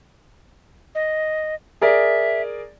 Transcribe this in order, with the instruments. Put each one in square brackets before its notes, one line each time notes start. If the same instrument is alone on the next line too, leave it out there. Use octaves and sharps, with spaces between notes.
[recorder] D#5
[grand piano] G#4 A#4 D5 [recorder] E5